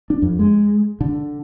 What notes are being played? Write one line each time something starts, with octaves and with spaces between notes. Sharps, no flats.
D4
F2
G#3
D3